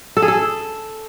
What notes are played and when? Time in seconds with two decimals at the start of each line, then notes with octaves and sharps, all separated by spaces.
0.17 A4
0.22 G#4
0.28 A4